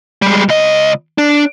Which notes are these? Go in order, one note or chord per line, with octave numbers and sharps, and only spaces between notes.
G3 G#3
C#2 D#5
D4